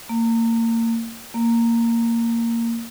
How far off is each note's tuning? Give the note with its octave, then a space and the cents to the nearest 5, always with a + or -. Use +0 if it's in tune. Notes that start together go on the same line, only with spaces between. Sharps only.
A#3 -30
A#3 -10